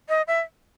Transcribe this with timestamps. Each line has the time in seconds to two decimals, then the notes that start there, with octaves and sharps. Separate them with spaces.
0.09 D#5
0.27 E5